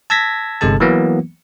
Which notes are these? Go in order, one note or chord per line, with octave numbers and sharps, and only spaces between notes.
A5 E6 G#6 A#6 B6
G1 C3 G#3 A4 A5
E3 F#3 A#3 B3